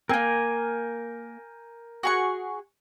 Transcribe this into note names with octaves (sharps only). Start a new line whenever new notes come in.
A#3 C4 A#4 G5 G#5
F#4 G#4 C#6